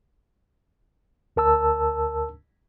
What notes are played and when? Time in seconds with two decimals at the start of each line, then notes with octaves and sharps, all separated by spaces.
1.36 D2 A#4 A5 E6